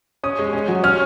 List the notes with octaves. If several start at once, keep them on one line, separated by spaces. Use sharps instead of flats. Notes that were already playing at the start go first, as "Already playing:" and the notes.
C#4 D#6
G#3
C#4
F#3
C#4 F6